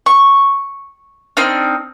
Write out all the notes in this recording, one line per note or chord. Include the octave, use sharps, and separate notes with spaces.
C#6
C4 D4 D#4 F6